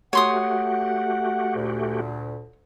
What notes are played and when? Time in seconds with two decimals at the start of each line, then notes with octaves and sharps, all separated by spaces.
0.13 A3 F#4 G4 C#5 F#5 C6 D#6
1.55 D2 A#2